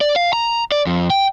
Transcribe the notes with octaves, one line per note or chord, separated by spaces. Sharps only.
D5
F5
A#5
D5
F2
G5